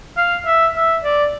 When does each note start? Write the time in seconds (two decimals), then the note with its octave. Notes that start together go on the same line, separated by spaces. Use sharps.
0.17 F5
0.46 E5
0.76 E5
1.04 D5